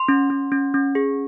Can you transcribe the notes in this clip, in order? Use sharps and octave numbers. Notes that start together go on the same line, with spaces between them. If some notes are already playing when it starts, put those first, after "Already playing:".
Already playing: C6
C#4
C#4
C#4
C#4
G#4